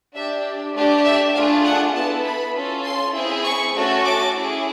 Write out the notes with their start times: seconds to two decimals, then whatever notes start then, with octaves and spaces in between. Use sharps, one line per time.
0.15 D4 G4 E5
0.75 A3 D4 G4
1.05 E5
1.35 A3 D4 F4 G#4 F5
1.65 F#5
1.95 B3 E4 A4 A5
2.25 B5
2.55 C#4 F4 A4
2.85 C6
3.14 C4 E4 G#4
3.44 C#6
3.74 A3 C#4 F#4 A4
4.05 D6
4.34 C#4 E4 G#4